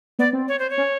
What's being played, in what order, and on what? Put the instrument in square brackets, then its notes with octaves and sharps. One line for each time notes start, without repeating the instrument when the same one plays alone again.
[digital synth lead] B3 [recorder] D5
[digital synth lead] C4
[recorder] C#5
C5
C#5
[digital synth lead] C#4